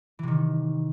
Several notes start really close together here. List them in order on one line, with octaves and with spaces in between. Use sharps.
E3 C3 D#3